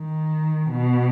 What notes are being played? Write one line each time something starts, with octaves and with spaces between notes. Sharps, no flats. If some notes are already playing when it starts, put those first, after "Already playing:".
Already playing: D#3
B2